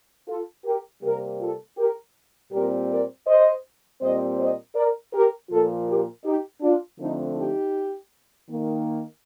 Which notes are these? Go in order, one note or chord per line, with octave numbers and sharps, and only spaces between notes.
F4 A4
G4 A#4
C3 G3 A#3 G4 A#4
F4 A4
G4 A#4
A#2 G3 C4 G4 A#4
A#4 D5
C5 D#5
A#2 G3 C4 C5 D#5
C5 D#5
A#4 D5
G4 A#4
A#2 F3 A#3 F4 A4
G4 A#4
D#4 G4
D4 F4
D3 F3 A3 C4 D#4
D#4 G4
D#3 A#3